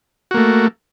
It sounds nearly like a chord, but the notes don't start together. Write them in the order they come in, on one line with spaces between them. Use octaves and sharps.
F#4 A#3 A3